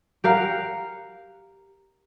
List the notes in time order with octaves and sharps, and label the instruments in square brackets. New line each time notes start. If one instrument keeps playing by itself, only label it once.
[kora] G4 A#4 F5 F#5